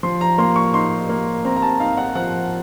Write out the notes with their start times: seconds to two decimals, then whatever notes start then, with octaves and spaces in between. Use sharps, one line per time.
0.03 F3 C6
0.21 A#5
0.38 A#3 C6
0.56 C#6
0.74 D#4 C6
1.09 A#3
1.45 C4 A#5
1.56 A#5
1.62 A5
1.80 D#4 F5
1.97 F#5
2.15 F3 F#5